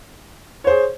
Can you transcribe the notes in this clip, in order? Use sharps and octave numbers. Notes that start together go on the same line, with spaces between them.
G#4 C5 C#5